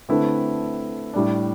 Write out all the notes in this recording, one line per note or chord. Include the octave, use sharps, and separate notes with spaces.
D3 A3 C4 E4 B4
A2 G3 D4